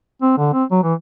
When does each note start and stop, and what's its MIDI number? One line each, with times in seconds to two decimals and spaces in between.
0.22 0.33 60
0.38 0.53 50
0.53 0.64 60
0.71 0.79 54
0.83 0.94 52